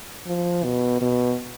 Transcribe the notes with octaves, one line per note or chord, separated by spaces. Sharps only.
F3
B2
B2